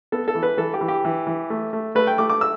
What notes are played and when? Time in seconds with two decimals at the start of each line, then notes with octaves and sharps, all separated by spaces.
0.12 B3 A4
0.28 A4
0.35 E3
0.43 B4
0.58 E3 A4
0.74 G4
0.81 E3
0.88 G4
1.05 E3
1.27 E3
1.50 A3
1.73 A3
1.95 A3 B4
2.07 G5
2.18 A3 D6
2.29 D6
2.41 E6